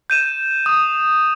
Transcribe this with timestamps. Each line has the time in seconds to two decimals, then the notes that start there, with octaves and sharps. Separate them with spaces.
0.10 G6 D#7 E7
0.66 D#6